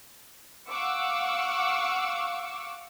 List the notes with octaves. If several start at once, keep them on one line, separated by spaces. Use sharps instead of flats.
F5 F#5 C#6 D6 E6